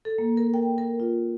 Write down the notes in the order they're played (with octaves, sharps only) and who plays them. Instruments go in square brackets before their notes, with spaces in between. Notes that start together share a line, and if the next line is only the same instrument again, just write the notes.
[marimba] A4
A#3
A#4
G5
A#4
F4